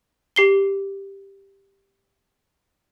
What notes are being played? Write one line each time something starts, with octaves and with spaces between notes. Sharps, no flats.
G4 C7 G7